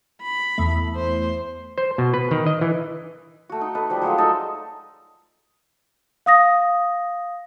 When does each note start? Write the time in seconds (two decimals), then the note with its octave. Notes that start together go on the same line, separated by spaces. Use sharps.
0.22 B5
0.58 E2 A3
0.96 C5
1.78 C5
1.98 B2
2.14 B4
2.31 D#3
2.46 D#5
2.61 E3
3.49 A3 F#4
3.61 D#4
3.75 A4 B4 D#5
3.90 F3 G3 B4
4.02 F#3 G#3 A3 F4
4.18 D#4 A4 D#5
6.26 F5 D#6 A#6